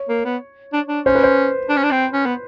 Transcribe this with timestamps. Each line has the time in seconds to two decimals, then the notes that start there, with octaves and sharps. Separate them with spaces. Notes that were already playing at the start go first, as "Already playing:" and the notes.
Already playing: C#5
0.09 A#3
0.25 B3
0.73 D4
0.88 D4
1.05 C#4 C5
1.15 B4
1.23 C5
1.69 D4
1.77 C#4
1.83 D4
1.91 C4
2.13 C#4
2.26 B3